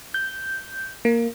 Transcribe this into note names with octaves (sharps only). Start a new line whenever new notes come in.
G6
A#3